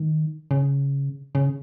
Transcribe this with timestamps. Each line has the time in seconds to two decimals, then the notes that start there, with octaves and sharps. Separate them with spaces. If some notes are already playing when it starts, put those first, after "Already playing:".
Already playing: D#3
0.51 C#3
1.35 C#3